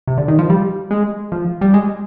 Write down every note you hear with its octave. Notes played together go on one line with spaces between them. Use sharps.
C3
D3
D#3
F3
G3
G#3
F3
G3
G#3